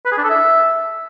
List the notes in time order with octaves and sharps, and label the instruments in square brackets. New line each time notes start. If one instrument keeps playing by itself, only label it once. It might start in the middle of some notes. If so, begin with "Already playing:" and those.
[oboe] B4
G#4
D4
A4
E5